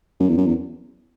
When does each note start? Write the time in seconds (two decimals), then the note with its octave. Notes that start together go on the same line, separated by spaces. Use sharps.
0.20 F#2
0.29 E2
0.38 F#2
0.46 E2